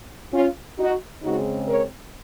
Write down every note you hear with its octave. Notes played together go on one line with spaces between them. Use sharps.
C#4 F4
D#4 F#4
C#3 G#3 C4 D#4 F#4
A#4 C#5